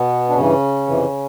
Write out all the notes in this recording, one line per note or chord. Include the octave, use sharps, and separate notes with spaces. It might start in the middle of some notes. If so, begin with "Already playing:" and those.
Already playing: B2 B3
D4
G2 C#3 E3 C#4
F2 C3 E3